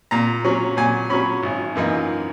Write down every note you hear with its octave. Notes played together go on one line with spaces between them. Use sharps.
A#2 A#5
F#3 C#4
A#2 G#5
F#3 C#4 B5
G#1
F#2 E3 A#3 D#4